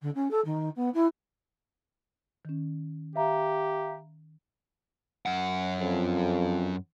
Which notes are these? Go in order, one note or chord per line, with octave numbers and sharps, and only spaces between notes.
D3
C#4
A4
D#3
B3
E4
D#3 C#4
G4 E5 F5 A#5
F#2 F#5
F2